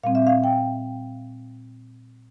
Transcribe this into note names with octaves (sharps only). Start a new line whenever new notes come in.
A#2 G3 C4 F5
E5
F5
G5